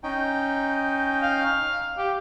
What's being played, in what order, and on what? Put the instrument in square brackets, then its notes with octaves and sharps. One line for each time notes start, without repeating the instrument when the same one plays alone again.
[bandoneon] C#4 D#4 G5
[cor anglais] F5
G4